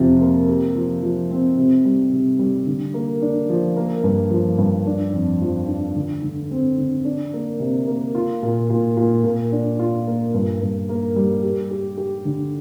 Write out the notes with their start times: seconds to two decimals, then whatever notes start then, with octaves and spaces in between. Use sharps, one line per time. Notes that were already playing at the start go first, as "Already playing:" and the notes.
Already playing: F2 C3 F4
0.21 A#3
0.49 G4
0.75 F3
1.03 F3
1.31 C4
1.58 C3
1.85 G3
2.13 C3
2.39 G3
2.67 D3
2.94 A#3
3.22 D4
3.49 F3
3.76 A#3
4.03 G2
4.31 F3
4.58 G2
4.87 D4
5.13 F2
5.41 F3
5.68 D4
5.96 D3
6.23 D3
6.51 C4
6.78 D3
7.05 D4
7.33 A#3
7.60 C3
7.87 A#3
8.15 F4
8.43 A#2
8.70 A#2
8.97 A#2
9.24 A#2
9.52 D4
9.79 F4
10.07 A#3
10.34 G2
10.62 G2
10.89 A#3
11.16 G3
11.43 G4
11.71 G4
11.97 G4
12.25 D3